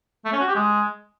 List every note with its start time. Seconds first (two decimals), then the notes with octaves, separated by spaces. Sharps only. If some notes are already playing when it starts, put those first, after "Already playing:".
0.25 A3
0.32 C#4
0.40 F#4
0.48 G4
0.55 G#3